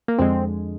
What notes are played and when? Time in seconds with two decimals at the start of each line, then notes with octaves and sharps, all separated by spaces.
0.08 A#3
0.18 F2 D3 G#3 C4